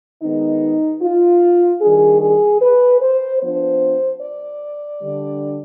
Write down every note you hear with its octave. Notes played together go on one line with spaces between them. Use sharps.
D#3 G#3 B3 D#4
F4
D#3 G3 D4 G#4
G#4
B4
C5
F3 B3 D4 C5
D5
D3 G3 D4